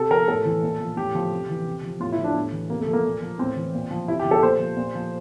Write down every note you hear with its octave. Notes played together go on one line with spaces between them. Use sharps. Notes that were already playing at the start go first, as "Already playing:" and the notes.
Already playing: C3 A4
F3 A#4
A2 A4
E3
A#2
F3
A2 G4
F3
C3
E3
C3
F3
A2 F4
E4
F3
D4
A2
E3
C3 A#3
A3
F3
A#3
A#2
F3
A2 C4
E3
A#2
F3
C3 E4
G4
F3
A4
A#2 C5
F3
A#2
F3